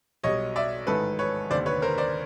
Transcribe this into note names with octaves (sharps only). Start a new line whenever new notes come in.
B1 B2 G3 C#5 D#5
D5 E5
A1 G#2 D#3 A4 B4
B4 C#5
F1 D#2 D3 C5 D5
B4 C#5
A#4 C5
C5 D5